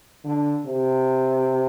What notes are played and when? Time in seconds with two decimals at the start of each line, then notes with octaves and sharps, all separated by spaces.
0.24 D3
0.66 C3